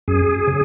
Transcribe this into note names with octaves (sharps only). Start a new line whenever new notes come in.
F#2 G#4
C#3